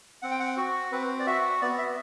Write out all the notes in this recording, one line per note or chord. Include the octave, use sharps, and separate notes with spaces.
C4 F#5
G5
F#5
F#4
C4 B4
D5
F#4 E5
B3 D5
E5